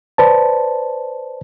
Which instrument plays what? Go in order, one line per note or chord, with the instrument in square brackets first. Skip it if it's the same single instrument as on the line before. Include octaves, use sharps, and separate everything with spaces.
[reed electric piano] B4 C5 D5 A5